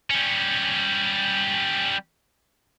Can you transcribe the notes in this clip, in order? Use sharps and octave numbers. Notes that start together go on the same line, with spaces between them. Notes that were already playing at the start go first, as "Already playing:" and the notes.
G3 C#4